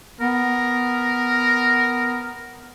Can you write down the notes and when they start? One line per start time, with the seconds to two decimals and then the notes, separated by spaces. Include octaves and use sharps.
0.21 B3 A#4